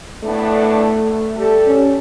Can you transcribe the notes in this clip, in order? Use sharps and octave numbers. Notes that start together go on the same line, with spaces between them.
A2 A3 B3 D4
G3 G4 A4
C#4